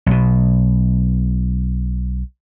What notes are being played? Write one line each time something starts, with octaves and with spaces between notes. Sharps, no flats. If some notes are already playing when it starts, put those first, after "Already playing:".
B1 B2